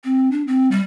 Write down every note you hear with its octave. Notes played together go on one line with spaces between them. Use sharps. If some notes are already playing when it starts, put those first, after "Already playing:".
C4
D4
C4
G3